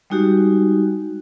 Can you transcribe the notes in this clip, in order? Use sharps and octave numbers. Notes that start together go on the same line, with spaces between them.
G3 G#3 D#4 F#4 G4